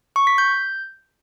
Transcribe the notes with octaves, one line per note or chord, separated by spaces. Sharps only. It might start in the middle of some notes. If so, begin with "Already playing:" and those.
C#6
B6
G6